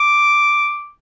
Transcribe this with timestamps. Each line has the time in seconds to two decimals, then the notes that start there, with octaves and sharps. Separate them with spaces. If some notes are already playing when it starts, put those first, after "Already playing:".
Already playing: D6